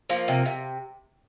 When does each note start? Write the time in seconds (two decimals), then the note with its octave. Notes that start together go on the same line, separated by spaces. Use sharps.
0.09 F3 A#3
0.28 C3
0.46 C3